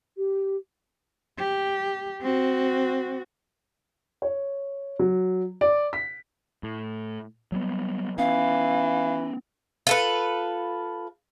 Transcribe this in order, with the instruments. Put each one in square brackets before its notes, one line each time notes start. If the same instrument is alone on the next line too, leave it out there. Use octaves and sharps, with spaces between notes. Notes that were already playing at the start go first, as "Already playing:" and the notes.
[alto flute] G4
[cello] G4
C4 F#4
[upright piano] C#5
F#3
D5
B6
[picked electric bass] A2
F#3 G3 B3
[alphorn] E3 [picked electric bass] B3 C#4 [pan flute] F5
[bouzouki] F4 A4 B4